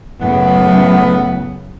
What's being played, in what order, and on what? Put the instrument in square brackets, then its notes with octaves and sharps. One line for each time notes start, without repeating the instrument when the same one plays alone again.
[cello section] F#2 C#3 [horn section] A2 B3